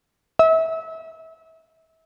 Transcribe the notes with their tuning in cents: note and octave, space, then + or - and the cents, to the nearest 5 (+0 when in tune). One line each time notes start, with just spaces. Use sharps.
E5 -25